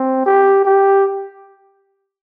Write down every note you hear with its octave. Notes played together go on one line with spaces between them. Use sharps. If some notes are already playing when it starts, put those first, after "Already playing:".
Already playing: C4
G4
G4